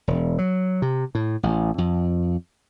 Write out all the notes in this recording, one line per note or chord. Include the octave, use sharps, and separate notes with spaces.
E1
F#3
C3
A2
A1
F2